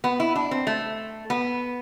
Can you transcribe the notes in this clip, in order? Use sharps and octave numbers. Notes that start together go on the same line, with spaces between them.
B3
E4
D4
C4
A3
B3